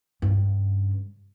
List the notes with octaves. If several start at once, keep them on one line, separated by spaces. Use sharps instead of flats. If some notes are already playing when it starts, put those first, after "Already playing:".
G2 C#3